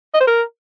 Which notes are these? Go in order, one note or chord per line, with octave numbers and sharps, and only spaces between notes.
D#5
C5
A#4